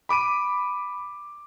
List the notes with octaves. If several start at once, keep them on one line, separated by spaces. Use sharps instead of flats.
B5 D6 D7 D#7